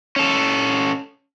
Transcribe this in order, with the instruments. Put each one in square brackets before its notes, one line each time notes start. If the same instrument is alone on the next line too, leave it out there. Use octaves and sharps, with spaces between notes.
[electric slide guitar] C#4 A4